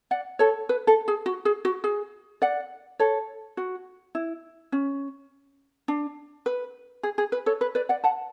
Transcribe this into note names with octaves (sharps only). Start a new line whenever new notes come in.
D5 F#5
A4 C#5
B4
A4
G#4
F#4
G#4
F#4
G#4
D5 F#5
A4 C#5
F#4
E4
C#4
D4
B4
G#4
G#4
B4
A4 C#5
B4
B4 D5
D5 F#5
F#5 A5